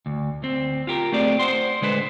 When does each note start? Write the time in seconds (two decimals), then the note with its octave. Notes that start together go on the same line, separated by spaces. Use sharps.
0.06 D2
0.42 D2 C4
0.87 F4 G4 A#4
1.12 A3 B3 C4 G#4 D5
1.39 C5 F#5 C6
1.82 D3 G#3 B4 C5